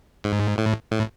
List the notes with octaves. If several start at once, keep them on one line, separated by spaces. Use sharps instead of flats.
G#2
A2
A2